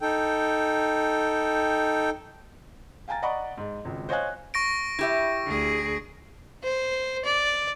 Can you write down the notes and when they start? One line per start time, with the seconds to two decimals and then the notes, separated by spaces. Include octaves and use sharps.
0.01 D#4 A4 G5
3.08 F5 G5 G#5 A#5 A6
3.22 D5 D#5 F#5 A#5 B5 C#6
3.58 G#2
3.85 G#1 C#2
4.09 C5 C#5 D#5 F5 G#5 F#6
4.54 C#6 A#6 D7
4.99 E4 G4 E5
5.46 D2 G#4
6.63 C5
7.25 D5